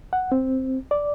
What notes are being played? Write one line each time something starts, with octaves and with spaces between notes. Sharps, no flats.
F#5
C4
D5